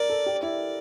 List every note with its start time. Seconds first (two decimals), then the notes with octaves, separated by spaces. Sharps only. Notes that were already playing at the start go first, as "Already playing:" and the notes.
Already playing: A#4 D5
0.10 A4
0.26 G4
0.43 E4 D5